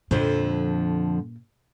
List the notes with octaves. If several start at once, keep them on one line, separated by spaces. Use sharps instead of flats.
F2 A#2 D3 F3